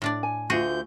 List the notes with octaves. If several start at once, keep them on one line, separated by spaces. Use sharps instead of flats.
A2 D4 D5
G#5
D2 A3 F4 F#4 G#4 G6